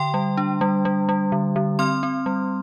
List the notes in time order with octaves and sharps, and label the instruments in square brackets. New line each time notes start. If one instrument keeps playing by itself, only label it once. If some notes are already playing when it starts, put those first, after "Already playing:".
Already playing: [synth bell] D3 G5 C6
G3
D4
G3
G3
G3
D3
D3
C4 C6 F6
C4
G3